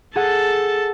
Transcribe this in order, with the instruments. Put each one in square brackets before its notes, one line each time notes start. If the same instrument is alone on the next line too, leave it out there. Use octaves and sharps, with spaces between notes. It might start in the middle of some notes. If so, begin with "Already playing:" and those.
[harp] G#4 F#5 [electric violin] A4 A5